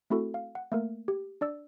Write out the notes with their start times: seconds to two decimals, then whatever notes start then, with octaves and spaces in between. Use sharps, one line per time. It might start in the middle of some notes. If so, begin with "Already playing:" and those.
0.10 A3 C4 E4 F#4 A4
0.34 F5
0.55 F#5
0.72 A3 A#3 A#4
1.08 G4
1.41 D4 D5 E6